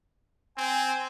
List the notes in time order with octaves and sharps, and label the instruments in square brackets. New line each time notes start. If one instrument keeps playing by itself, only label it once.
[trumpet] C4 [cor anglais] G#5